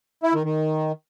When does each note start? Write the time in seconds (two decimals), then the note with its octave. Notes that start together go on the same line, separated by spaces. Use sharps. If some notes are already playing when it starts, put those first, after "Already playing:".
0.23 E4
0.34 D#3
0.44 D#3